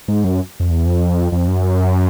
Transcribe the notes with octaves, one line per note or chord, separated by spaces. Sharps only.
G#2
F#2
F2
E2
F2
F2
F#2